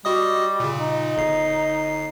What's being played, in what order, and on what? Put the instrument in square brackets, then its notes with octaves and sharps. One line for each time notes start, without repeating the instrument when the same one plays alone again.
[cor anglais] G3 [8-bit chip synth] F#4 D#5 D#6
[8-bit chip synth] A#2 C#3
[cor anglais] D#4
[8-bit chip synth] G1 C7